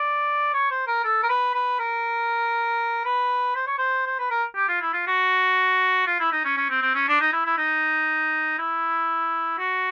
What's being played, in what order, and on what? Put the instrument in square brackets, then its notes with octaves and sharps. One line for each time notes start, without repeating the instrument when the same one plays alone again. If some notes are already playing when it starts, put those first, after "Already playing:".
Already playing: [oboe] D5
C#5
C5
A#4
A4
A#4
B4
B4
A#4
B4
C5
C#5
C5
C5
B4
A#4
G4
F4
E4
F4
F#4
F4
E4
D#4
C#4
C#4
C4
C4
C#4
D4
D#4
E4
E4
D#4
E4
F#4